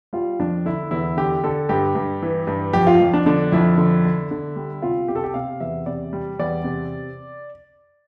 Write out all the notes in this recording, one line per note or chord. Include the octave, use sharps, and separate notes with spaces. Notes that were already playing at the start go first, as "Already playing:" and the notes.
G3 F4
F2 D4
D3 E4
E2 E4
D3 G4
D3 A4
G2 G4
G2
E3
G2
F2 G4
F4
F2
D4
D3 D4
F2 E4
D3
D3
D3
G3
C3 F4
C3 G4
A4
G4
C3 F5
E2 E5
C3 D5
G3
E2 D5
C3